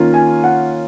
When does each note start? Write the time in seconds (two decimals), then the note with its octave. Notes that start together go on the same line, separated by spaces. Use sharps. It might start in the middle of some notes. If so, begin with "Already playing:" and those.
Already playing: D#3 A#3 C#4 F4
0.14 G#5
0.44 F#5